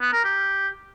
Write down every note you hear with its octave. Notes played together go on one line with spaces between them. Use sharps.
B3
A#4
G4